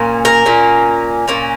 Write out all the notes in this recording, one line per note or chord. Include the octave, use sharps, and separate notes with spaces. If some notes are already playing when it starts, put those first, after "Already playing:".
Already playing: A#2 A#3 C#4
A#4
A#2 A#3 C#4
A#2 A#3 C#4